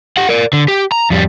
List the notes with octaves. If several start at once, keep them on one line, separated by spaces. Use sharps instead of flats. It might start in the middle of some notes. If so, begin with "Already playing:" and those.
G4 F#5
A#4 D5
D3
G4
A#5
F2 G3